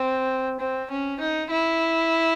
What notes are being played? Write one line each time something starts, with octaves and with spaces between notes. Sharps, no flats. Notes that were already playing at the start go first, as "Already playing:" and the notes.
Already playing: C4
C4
C#4
D#4
E4